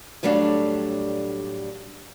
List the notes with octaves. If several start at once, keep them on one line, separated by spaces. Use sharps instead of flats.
A2 F#3 G3 A3 D4 F5